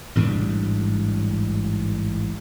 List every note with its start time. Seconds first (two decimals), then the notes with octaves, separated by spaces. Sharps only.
0.15 A1 G#2 G3 D4